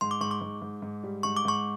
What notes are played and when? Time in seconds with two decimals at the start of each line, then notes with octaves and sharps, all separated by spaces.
0.01 G#2 C6
0.11 D6
0.21 G#2 C#6
0.31 D6
0.41 G#2
0.62 G#2
0.82 G#2
1.03 G3
1.23 G#2 C#6
1.37 D6
1.45 G#2 C#6